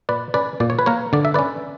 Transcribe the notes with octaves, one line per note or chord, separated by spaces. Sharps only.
A#2 B4 D5
C#4 B4 D5
A#2 D5
C#5
B4
A#3 A#4 C#5
D3 D5
E5
C#4 B4 D5